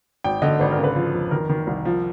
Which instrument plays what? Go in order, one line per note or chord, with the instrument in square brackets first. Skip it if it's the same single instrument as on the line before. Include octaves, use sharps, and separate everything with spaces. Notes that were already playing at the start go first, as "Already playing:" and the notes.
[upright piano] G#1 G5
D3 D#5
G#1 B4
A#4
C#3
B4
F3
F2
D#3 A#4
D#3
C2
F3